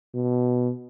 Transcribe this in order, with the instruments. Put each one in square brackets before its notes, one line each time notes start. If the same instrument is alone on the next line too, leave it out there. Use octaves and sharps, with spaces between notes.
[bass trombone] B2